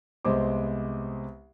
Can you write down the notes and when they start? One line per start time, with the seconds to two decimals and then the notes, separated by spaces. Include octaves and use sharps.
0.25 C2 G#3 B3 C5 D6